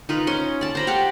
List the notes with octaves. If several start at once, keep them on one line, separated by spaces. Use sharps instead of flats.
D#4 F4 B4
C#4 C6
D5 A5
C5 A#5 B5
G4 F5 F#5